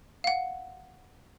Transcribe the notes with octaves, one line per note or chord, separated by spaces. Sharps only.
F5 F#5